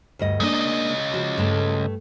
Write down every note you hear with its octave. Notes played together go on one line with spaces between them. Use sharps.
D2 G2 D#5
C#3 G#3 A#3 D4 D#5
F3 F#4
G2 A3 A4